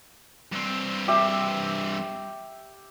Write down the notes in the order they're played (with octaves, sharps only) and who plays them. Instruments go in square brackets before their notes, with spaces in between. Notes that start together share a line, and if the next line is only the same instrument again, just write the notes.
[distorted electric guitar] G2 C4
[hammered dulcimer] G4 E5